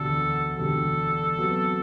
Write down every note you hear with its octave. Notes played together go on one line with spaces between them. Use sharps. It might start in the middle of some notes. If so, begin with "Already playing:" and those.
Already playing: E1 D2 D3 G3 A4
E1 D2 D3 G3 A4
C3 F#3 B3